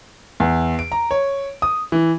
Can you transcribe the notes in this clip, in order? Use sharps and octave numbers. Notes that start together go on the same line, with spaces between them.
E2
D7
A#5
C#5
D#6
E3